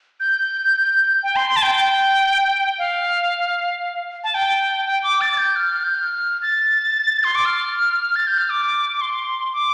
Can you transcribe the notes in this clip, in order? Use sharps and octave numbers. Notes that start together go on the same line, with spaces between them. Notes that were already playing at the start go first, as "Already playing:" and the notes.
G6
G5
C6
C6
A5
G5
G5
F5
A5
G5
G5
D6
A6
A6
G6
F6
F6
G6
F6
A6
C6
D6
F6
A6
G6
F6
D6
D6
C6
D6